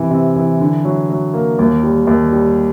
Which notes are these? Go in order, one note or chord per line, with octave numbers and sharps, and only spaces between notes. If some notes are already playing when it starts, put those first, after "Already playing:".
Already playing: C3 E3
C3
E3
D3
F#3
F#3
A#3
D#2
G3
D#2
G3